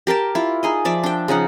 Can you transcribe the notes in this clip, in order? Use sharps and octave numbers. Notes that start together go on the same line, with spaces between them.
G4 A#4 G5 A5
E4 F4
D#4 G#4 D#5
F3 D5 E5
D4 G5
C#3 F3 D#4 F#5